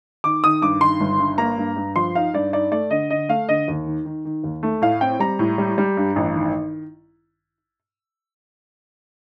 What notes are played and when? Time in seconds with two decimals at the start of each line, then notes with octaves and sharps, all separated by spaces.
0.24 D#3 D6
0.44 D#3 D#6
0.62 G2 D6
0.81 D#3 C6
1.00 G1
1.19 G2
1.38 A#3 A#5
1.58 G2
1.76 G2
1.96 F3 C6
2.15 D#4 F5
2.34 G2 D5
2.53 D#4 D5
2.72 A3 D5
2.91 D3 D#5
3.10 D3 D#5
3.29 A3 F5
3.49 D3 D#5
3.68 D#2
3.86 D#3
4.05 D#3
4.25 D#3
4.44 D#2
4.63 A3
4.82 A2 F5
5.01 C4 G5
5.20 G3 A#5
5.39 A2
5.58 G3
5.78 G3
5.97 G2
6.16 A1
6.34 D#3